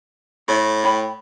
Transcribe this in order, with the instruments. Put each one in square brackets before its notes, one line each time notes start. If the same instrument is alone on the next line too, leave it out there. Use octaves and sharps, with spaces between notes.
[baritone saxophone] A2 [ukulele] C#5
[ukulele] C#5 G5 B5